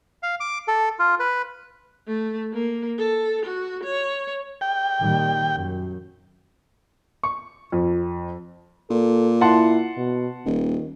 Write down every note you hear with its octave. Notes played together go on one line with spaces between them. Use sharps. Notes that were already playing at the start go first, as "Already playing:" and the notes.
F5
D6
A4
F4
B4
A3
A#3
A4
F#4
C#5
G5
A#2 D#3 G3
F#2
C#6
F2
A#2 A4
E4 F#5 A5 C6
B2
D#1 D#3